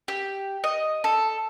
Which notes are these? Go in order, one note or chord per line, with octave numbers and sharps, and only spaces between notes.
G4
D#5
A4